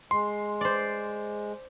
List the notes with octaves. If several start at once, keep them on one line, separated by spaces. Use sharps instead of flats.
G#3 C6
C5 D5